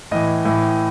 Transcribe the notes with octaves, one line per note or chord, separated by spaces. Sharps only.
A2 E3 D#5
A2 E3